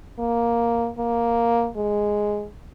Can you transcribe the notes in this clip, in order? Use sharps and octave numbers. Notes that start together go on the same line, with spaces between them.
A#3
A#3
G#3